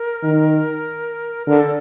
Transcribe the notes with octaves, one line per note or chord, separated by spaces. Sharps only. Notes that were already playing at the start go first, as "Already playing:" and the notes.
Already playing: A#4
D#3
D3 A#4
A4